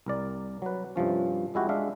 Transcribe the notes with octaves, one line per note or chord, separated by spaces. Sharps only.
C2 A#4 D5
F#3 B4
G2 C3 F3 C#4
F2 G#3 E4 F#4 G4
G#3 D4 E5 F5